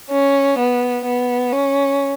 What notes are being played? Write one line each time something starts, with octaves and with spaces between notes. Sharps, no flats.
C#4
B3
B3
C#4